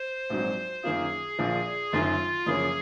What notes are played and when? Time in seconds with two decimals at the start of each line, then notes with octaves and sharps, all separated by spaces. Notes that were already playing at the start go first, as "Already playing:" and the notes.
Already playing: C5
0.30 A#1 G#2 F#3 C4
0.84 F#2 D#3 A#3 F4 G#4
1.39 A#1 A#2 F3
1.92 F#1 F#2 D#3 F4
2.46 F#2 C#3 F3 A#3 C#4 G#4